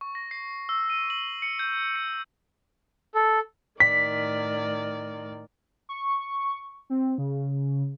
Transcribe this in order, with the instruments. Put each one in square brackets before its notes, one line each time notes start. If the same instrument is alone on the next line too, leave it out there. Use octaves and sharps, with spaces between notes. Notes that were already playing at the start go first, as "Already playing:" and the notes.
[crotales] C#6
A#6
C7
E6
D#7
F#7
C#7
G6
C#7
[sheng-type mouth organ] A4
[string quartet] A2 D#3 D5 [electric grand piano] B6
[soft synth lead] C#6
C4
C#3